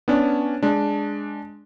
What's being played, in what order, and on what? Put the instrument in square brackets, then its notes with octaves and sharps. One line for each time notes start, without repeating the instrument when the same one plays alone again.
[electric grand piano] B3 C#4 D4
G#3 D4